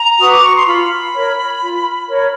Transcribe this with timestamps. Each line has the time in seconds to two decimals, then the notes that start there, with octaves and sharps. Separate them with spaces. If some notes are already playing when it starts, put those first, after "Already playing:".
Already playing: A#5
0.18 F#4 B4 D#6
0.31 D6
0.43 C#6
0.54 C6
0.65 F4 B5
1.13 A#4 C#5
1.60 F4
2.07 A#4 C#5